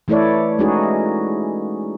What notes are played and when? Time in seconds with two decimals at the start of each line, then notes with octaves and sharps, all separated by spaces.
0.08 E3 A3 E4 A4 C#5 D5
0.59 G#3 C#4 D#4 F#4 G#4